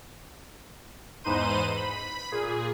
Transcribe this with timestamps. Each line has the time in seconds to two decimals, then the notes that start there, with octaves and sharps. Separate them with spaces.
1.24 E2 G#2 D#4 B4 C5 D#7
1.76 B5
2.31 A#2 G#4